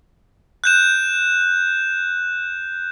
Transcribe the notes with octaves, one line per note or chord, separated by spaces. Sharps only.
F#6 G6 E7